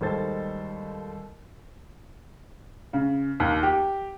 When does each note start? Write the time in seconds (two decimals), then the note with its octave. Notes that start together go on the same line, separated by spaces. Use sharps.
0.01 D#2 G3 G#3 A4 C5 A6
2.93 C#3
3.40 D#2
3.63 G4